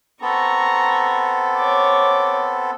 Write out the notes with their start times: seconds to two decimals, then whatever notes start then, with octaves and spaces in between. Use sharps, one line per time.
0.22 B3 C4 A4 A#5 C#6
1.57 C#5 D6